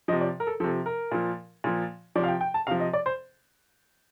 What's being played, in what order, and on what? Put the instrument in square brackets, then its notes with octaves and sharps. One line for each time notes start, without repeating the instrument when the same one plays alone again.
[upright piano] F3 D#5
C3
D5
A#4
A4
F3 A4
C3
A#4
A#2 F3
A#2 F3
F3 D5
C3 F5
G5
G5
A5
C3 F3 F5
D#5
D5
C5